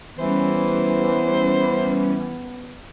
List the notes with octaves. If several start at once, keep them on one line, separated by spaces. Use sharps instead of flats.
E3 G3 B3 C#4 C5